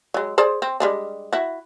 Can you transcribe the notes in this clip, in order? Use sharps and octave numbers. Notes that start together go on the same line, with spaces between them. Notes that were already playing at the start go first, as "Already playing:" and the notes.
F#3 G#3
G#4 C5 D5
C4
G3 G#3 D4
E4 F#4